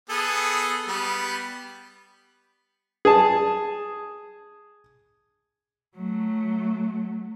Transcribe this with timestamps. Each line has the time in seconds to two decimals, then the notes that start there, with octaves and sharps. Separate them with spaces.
0.10 B3 G#4 A4
0.88 G3 B3
3.05 G#4 A5
5.97 F#3 A3